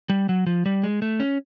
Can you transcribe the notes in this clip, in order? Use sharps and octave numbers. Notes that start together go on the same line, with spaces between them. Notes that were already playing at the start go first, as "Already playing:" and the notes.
G3
F#3
F3
G3
G#3
A3
C#4